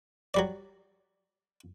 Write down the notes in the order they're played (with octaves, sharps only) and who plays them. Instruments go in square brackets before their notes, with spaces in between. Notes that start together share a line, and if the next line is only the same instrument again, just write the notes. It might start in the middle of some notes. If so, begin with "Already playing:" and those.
[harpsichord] F#3 G3 D5